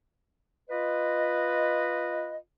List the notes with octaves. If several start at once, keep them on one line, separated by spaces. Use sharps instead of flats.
F4 B4 D#5